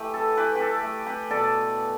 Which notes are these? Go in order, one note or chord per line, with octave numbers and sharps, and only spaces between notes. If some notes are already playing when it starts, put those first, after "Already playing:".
Already playing: E3 A3 G4 B4
A4
E3 G4 B4
G4 A4
A3
G4 B4
B2 A4 D5